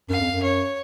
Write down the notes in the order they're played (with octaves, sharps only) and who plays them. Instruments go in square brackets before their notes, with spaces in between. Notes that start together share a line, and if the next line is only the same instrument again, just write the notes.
[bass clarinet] F#2 [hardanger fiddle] F5
[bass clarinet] F2
F#2
[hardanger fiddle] C#5